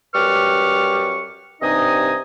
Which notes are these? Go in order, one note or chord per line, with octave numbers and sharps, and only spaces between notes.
F#2 G3 B4 C#6 D6 F6
G2 C3 D#4 D#5 G#5 D#6